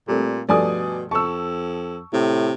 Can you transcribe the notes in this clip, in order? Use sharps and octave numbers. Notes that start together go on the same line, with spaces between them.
A#2 G3 A3 C4
G2 B2 F3 A3 D5 G#5 D#6
F2 A5 C#6 E6
A2 C3